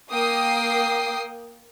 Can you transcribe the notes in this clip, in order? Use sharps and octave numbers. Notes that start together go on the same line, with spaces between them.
A#3 G5 D#6 C7